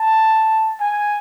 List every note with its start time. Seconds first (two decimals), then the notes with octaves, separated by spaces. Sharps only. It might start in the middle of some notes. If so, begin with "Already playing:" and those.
Already playing: A5
0.80 G#5